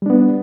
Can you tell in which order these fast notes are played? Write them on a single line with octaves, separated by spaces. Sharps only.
G3 D4 B3